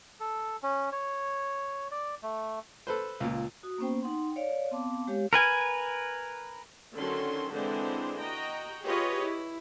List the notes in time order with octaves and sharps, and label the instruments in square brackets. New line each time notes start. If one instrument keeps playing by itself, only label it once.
[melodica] A4
C#4
C#5
D5
A3
[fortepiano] A4 B4 C5
C#2 A#2
[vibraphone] F#4 D#6
A#3 B3 C#4 C5 G5
D#4 F#5 G5 C6
C#5 D5 F5
B3 C4 F5 A5 D6
G#3 G4 C#5 F5
[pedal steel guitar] A#4 B4 G#5
[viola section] D3 D#3 F#3 C#4 A4 C6
D3 E3 G#3 C4 D4 C5
F#4 D#5 G5 A#5
F4 G4 G#4 B4 C#5 D#5
E4